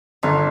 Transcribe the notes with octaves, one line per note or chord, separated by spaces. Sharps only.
G1 D3